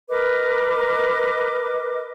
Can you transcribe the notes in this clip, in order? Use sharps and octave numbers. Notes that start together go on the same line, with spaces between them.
A#4 B4 D#5 D6